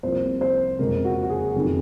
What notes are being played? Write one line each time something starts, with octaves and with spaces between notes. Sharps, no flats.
C2 C3 F3 A#3 C5
C5
F#1 F2 C#3 G#3 A#4
F#4
F#4
G#4
F#1 F2 D#3